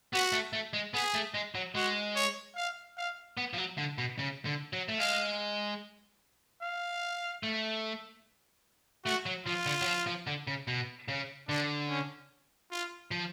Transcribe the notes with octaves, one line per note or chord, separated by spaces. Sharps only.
B3 F#4
A3
A3
G#3
B3 G#4
A3
G#3
F#3
G#3 F#4
C#5
F5
F5
B3
F3
F#3
D3
B2
C#3
D3
F#3
A3
G#3 F5
F5
A3
A3 F#4
F#3
F3 F4
D3
F#3
F3
F3
D3
C#3
B2
C#3
D3 D4
C#4
F4
F3